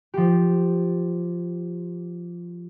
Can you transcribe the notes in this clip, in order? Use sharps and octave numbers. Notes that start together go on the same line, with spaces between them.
F3 G4